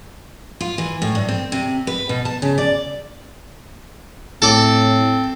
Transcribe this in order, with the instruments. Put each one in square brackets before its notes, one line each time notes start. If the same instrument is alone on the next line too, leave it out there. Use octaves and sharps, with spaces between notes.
[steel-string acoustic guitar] F4
E3
A2
G2
C4
C3
B4
B2
A5
C#3
D5
[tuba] A2 [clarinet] C4 [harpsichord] A4 D5